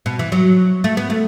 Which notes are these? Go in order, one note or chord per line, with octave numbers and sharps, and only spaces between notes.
B2
E3
F#3
A3
B3
A3